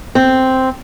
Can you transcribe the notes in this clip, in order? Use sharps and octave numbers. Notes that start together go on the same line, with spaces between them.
C4